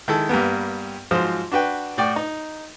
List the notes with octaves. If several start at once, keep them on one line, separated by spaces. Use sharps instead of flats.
D#3 G#3 E4 A4
G2 G3 A#3 B3
G#2 F3 F#3 C5 D#6
D4 F#4 B4 G5
A2 F#4 D5 G5
D#4